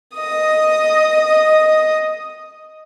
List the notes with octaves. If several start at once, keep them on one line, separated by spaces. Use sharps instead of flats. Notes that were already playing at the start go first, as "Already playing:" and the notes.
D#5 D#6